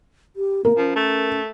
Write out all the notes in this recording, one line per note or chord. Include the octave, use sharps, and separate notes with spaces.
G4
A#3 A#4
F3 C#4
A3